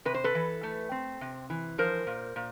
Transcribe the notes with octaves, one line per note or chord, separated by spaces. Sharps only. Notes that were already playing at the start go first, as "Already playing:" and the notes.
C3 B4
C5
A4 B4
E3
A3
C4
C3
E3
F3 A#4 C5
A#2
A#2